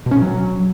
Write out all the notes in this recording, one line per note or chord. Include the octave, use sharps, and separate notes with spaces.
B2
C#4
B2
F#3